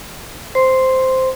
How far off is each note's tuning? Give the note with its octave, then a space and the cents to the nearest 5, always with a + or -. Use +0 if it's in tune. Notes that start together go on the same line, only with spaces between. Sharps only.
C5 -5 C6 +0